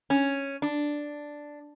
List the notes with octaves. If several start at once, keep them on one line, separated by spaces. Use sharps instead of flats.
C#4
D4